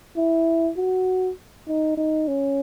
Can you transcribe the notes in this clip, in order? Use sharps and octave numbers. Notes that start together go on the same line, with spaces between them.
E4
F#4
D#4
D#4
C#4